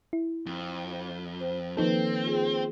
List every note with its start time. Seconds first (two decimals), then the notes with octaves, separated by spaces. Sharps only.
0.13 E4
0.46 F2
1.40 C5
1.77 D#3 F3 A#3 C4 D#4 A4 B4
2.24 F4 G#4